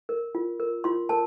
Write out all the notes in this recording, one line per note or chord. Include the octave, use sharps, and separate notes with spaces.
A#4
F4
A#4
F4 C6
A#4 A5